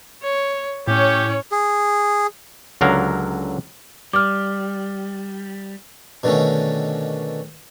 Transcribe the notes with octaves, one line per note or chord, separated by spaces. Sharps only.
C#5
A2 C#4 G4 C#5
G#4
C#2 D3 F#3 A#4 F5
G3 D6 F6
B2 D3 D#3 A3 C#4